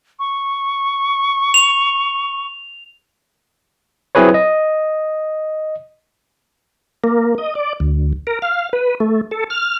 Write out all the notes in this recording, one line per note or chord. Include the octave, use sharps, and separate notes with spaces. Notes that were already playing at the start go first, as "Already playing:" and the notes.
C#6
F7
F#3 C4 E4 G#4 B4 C#5
D#5
A#3
D#5
D5
D2
A#4
F5
B4
A3
A4
F6